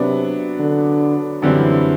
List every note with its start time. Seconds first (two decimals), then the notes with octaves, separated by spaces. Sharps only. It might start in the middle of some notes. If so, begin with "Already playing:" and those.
Already playing: C3 F#3 B3 D4
0.60 D3
1.42 F#2 D3 E3 G3 C4